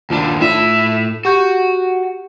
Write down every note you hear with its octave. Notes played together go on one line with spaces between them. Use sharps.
D#2 D4 F4
A2 D#4 F4 E5
F#4 G4 C#6 G6